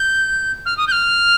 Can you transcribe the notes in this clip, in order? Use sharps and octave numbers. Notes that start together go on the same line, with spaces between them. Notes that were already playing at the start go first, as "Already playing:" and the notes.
Already playing: G6
F6
D#6
G6
F6